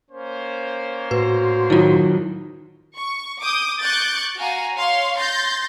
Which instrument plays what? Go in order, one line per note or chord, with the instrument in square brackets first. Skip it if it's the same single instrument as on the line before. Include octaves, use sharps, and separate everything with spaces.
[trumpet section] A#3 C#4 C5
[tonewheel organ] A2 F#4 C6 [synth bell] B4
[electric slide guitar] D#3 F#3 [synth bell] E4 F4
[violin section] C#6
D6 D#6 G6
C#6 D6 F#6 G6 A6
F#4 F5 G#5 A#5
C#5 F5 C6
C6 G6 A6 A#6